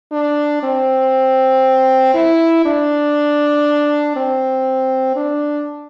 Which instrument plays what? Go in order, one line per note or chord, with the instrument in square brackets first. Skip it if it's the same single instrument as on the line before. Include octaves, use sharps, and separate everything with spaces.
[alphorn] D4
C4
E4
D4
C4
D4